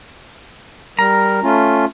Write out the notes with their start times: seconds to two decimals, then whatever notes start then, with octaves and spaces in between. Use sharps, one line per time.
0.99 G3 A#4 A#5
1.43 A3 C#4 F4